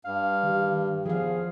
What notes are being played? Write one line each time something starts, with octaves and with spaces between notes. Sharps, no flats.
G2 F5
D#3 G4
E2 F3 G#4 F5